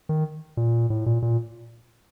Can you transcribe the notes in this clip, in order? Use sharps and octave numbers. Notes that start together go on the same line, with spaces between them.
D#3
A#2
A2
A#2
A#2